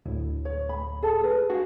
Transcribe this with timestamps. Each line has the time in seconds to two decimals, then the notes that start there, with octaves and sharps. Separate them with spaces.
0.06 D2 A2 E4
0.45 C#5
0.69 B5
1.02 G#4 A4 A5
1.21 G#4 B4
1.50 D4 F#4 G#4 F5